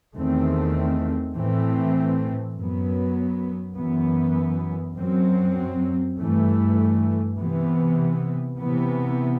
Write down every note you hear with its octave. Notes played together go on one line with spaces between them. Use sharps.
E2 D#3 A3 C4
A2 E3 A3 C4
F#2 F#3 B3
F#2 E3 B3
F#2 F#3 C4
G2 E3 A3
C3 E3 B3
C3 E3 B3